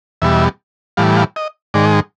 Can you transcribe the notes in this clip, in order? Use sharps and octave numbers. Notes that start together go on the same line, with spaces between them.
E2 B2 G3 E5
A2 E3 G3 F5
F5
D#5
G#2 D#3 G#3 D5